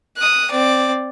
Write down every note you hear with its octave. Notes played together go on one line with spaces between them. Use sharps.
D#6 F#6
C4 D5